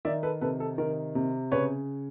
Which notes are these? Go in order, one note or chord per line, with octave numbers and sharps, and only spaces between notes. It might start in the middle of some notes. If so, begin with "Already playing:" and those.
D#3 D5 E5
A4 B4
C3 A4 B4
A4
D#3 A#4
C3
C#3 B4 C#5